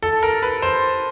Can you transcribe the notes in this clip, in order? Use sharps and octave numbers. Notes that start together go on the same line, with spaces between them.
A4
A#4
B4
C5